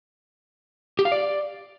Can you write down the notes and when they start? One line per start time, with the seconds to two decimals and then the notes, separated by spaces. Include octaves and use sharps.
0.99 G4
1.05 F5
1.12 D5